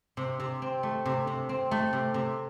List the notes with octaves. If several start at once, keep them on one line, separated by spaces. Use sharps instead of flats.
C3
C3
C4
A3
C3
C3
C4
A3
C3
C3